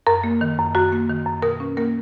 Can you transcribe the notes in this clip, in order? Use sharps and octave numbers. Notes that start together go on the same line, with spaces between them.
F#2 A#4
A#3
D#3
F#2
F#2 F#4
A#3
D#3
F#2
B2 A#4
C#4
A#3 A#4